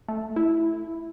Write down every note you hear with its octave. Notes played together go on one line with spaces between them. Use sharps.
A3
E4